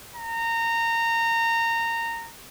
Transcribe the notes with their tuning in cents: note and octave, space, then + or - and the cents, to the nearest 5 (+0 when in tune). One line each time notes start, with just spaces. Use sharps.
A#5 -20